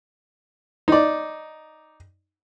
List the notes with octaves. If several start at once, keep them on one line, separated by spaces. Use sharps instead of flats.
D#4 D5